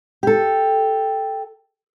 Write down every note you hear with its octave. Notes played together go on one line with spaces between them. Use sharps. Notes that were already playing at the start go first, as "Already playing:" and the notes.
G4 A4